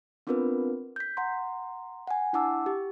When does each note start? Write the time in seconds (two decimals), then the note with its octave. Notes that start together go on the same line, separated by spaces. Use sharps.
0.27 B3 C4 D4 F4 A#4 B4
0.96 G6 B6
1.17 F#5 A#5 C6
2.07 F#5 G#5
2.33 D4 E4 F#5 A5 D6 E6
2.66 G4